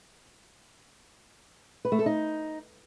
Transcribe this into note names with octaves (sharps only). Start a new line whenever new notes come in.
B4
A3
A4
D#4